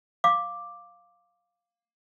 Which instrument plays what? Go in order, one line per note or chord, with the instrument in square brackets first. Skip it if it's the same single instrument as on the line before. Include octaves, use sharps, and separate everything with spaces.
[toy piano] F5 D6